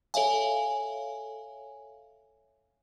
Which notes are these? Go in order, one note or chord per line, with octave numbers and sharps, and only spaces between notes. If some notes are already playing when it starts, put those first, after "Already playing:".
A4 C#5 E5 F5 G#5